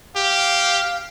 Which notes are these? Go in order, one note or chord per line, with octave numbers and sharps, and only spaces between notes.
G4 F5